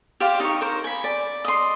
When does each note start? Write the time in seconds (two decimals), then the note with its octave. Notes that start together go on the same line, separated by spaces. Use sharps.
0.20 G4 C5 D5 F5
0.40 D#4 C#6
0.61 A#4 C5
0.84 G#5 B5
1.04 D5
1.45 D#5 C6